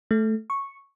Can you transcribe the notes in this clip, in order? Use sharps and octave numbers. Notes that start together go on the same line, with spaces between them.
A3
C#6